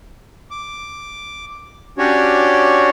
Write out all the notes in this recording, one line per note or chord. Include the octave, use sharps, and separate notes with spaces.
D6
C#4 D4 F#4 G4 C#5